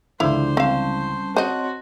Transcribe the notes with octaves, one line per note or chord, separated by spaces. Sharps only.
C#2 D3 E3 F3 D4 E4 C5
G3 C4 C#4 F5 A5
C4 F#4 C5 C#5 D#5 A5 C6